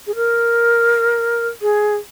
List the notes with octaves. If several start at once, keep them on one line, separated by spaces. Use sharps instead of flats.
G#4
A#4
G#4